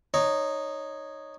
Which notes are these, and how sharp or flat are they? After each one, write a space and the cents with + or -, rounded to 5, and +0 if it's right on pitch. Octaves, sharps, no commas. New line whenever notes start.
D#4 -10 C#5 +0